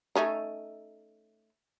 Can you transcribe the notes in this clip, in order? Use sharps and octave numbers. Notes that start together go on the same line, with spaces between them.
A3 C#4 D#4